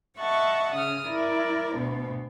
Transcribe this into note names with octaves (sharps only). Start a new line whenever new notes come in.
D#5 E5 F#5 A5 C#6
C#3 D#6 F6
E4 A#4 D5
D2 B2 B3